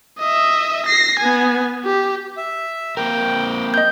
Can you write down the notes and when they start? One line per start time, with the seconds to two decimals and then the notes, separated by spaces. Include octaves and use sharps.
0.19 D#5 E5
0.86 A#6 C7
1.19 B3 G#5
1.85 G4
2.37 E5
2.97 A#3 C4 A#4 G5
3.74 D#5 G6